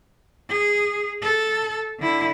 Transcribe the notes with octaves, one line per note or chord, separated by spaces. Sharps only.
G#4
A4
D3 E4